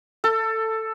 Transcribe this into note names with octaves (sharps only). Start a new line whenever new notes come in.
A4